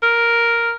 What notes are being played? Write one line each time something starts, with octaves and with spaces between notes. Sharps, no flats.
A#4